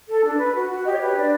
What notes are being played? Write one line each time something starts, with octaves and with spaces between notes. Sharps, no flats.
A4
D4
B4
F#4
F#4
G4 D#5
C#5
D5
B4
C#5
D4 D5